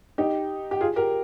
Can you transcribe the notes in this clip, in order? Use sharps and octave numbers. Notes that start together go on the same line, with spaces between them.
D#4 G4
G4
F4 G#4
G4 A#4